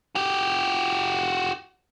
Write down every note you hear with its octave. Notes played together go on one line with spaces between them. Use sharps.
F#4 G4